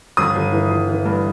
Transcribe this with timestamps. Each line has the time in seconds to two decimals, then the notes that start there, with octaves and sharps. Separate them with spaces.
0.17 G1 D#6
0.36 G1
0.52 E3
0.71 G1
0.89 E3
1.05 G2